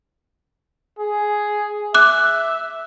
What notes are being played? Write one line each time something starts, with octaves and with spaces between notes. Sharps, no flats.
G#4
E5 D6 F#6